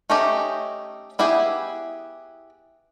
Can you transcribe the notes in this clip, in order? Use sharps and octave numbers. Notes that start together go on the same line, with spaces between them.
A3 C#4 D#4 G4
B3 E4 G4 G#4